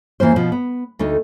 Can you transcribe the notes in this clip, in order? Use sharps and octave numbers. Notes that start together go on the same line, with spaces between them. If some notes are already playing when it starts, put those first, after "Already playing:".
E2 E3 A#3 C#4 C5
B2 F3
B3
D2 A3 D#4